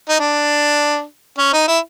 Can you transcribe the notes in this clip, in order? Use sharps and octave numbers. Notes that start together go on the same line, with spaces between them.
D#4
D4
C#4
D#4
E4